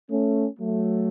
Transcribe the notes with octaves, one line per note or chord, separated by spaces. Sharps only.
A3 C#4
F#3 A3